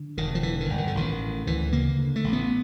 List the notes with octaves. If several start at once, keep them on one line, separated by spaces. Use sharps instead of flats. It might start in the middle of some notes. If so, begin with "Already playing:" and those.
Already playing: D3
E1 D#3
F3
D3 E3
D#3
G1
D#3
D3
A1 D#3
A2
D2 E3
C#3 A#3
D3
A3
A1
B3